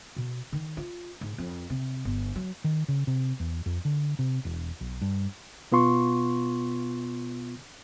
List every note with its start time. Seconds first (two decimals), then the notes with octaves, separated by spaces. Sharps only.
0.16 B2
0.52 D#3
0.77 F4
1.21 G#2
1.38 F2
1.70 C3
2.05 G1
2.36 F#3
2.64 D#3
2.88 C#3
3.07 C3
3.40 E2
3.66 F2
3.85 D3
4.19 C3
4.45 E1
4.81 B1
5.02 G2
5.72 B2 B3 F4 C6 C#6